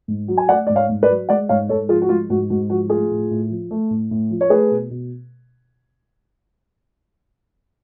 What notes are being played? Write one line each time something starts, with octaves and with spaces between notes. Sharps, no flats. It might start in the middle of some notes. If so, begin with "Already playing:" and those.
G#2
F#3
G#5
A3 D5 F#5
G#2 D5
C#5 F5
G#2
B4 D5
F#3
G#3 D5 F#5
G#2 C#5 F5
G#2 A4 C#5
F3 F4 G#4
F#4
G#3 F4
G#2 F#4
G#2 F#4
F3 F#4
A3 F4 G#4
A2
A2
F3
A3
A2
A2
F3
C#5
A3 G#4 B4
B2
B2